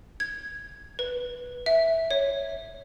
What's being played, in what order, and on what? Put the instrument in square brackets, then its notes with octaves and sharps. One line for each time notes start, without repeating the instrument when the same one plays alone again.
[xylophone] G#6
B4
E5
C#5